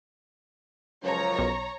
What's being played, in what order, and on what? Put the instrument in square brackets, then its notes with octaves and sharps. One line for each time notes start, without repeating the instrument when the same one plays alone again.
[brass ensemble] C#2 F#2 F3 [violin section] C#5 A#5
[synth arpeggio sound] B1